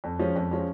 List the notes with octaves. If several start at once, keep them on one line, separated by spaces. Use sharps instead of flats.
F2
F3 G#3 C#4
F2
F3 G#3 C#4